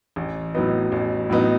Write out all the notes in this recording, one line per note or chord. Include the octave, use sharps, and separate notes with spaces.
A1
A2 F#3 B3 D#4
A1
A2 F#3 B3 D#4